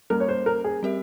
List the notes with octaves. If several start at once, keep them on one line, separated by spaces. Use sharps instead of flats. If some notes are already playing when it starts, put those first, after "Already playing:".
G3 A#3 C#4 A#4
C#5
C5
A#4
G#4
G3 C4 G4 A#4 E5